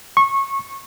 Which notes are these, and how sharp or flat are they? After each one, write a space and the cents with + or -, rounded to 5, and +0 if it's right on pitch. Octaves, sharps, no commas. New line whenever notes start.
C#6 -20